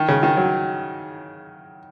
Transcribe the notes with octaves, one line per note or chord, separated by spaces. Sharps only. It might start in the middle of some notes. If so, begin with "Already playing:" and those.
Already playing: D#3
C#3
D#3
F#3